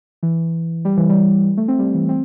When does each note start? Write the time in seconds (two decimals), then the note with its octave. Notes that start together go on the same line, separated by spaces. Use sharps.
0.23 E3
0.85 G3
0.97 E3
1.09 G3
1.57 A3
1.68 C4
1.79 G3
1.94 E3
2.09 C4